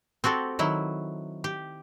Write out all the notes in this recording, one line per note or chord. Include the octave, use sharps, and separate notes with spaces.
C4 F#4 G4 A4
D#3 F#3 E4
G4